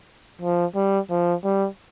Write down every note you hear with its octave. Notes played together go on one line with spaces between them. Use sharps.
F3
G3
F3
G3